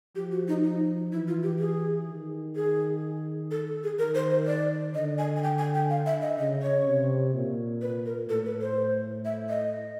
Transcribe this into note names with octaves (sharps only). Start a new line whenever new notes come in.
F3 G4
F#4
D#4
D#4
E3 E4
F4
G4
G#4
D#3
G#4
A4
G#4
D#3 A#4
C5
C5
D5
D3 D#5
G#5
G#5
G5
G#5
G5
F5
E5
D#5
C#3 D#5
C#5
C3
A#2
B4
A#4
A2 A4
B4
C5
E5
D#5